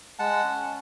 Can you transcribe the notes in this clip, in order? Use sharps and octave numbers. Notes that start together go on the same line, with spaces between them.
G#3 F#5 A5
C#4